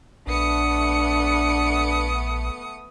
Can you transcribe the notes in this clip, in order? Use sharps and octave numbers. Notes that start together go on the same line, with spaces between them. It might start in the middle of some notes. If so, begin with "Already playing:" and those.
A#1 A3 B3 D4 D#6 C#7